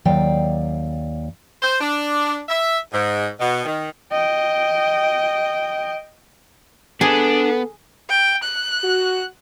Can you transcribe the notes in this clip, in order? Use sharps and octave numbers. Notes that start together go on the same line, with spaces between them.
D#2 F#3 D5 F5 G5
C5
D4
E5
G#2
B2
D#3
D#5 G5
B3 D4 G#4 A4
G5
F#6
F#4